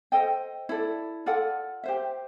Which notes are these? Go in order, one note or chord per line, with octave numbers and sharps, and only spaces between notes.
A4 C5 D#5 G5
E4 A4 D5
F4 A4 D5 F#5
G4 C5 E5